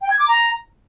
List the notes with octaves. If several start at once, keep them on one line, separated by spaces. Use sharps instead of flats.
G5
G#6
D6
A#5